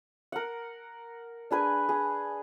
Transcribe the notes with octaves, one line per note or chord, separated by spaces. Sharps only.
A#4 F#5
D4 G#4 B4 G#5
G#4